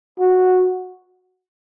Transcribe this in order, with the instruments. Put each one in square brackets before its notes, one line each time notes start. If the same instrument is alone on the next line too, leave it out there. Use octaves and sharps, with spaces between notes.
[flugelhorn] F#4